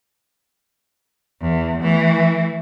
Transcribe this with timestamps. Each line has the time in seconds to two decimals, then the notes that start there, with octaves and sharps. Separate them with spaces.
1.41 E2
1.81 E3 A3